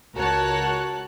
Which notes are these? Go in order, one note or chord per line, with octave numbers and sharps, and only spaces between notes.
C#2 F#4 A#4 C#5 A5 F#6